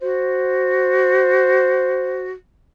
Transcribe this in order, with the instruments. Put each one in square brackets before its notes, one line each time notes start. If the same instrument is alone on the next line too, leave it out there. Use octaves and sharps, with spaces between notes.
[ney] F#4 [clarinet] C5